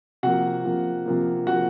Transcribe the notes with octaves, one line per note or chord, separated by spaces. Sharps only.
C3 F3 A#3 F#4 F#5
C3 F3 A#3
C3 F3 A#3
C3 F3 A#3 F#4 F#5